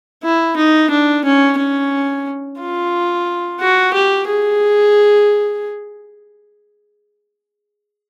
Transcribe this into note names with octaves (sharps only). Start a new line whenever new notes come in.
E4
D#4
D4
C#4
C#4
F4
F#4
G4
G#4